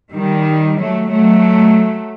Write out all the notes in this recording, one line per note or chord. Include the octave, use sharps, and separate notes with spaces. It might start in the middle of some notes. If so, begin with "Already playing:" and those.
D#3 G3
F#3 A3
F#3 A3